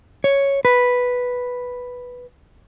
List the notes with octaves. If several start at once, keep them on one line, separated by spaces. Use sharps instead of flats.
C#5
B4